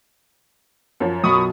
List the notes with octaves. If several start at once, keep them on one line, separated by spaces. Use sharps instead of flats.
F#2 F3
B1 B5 C#6 D#6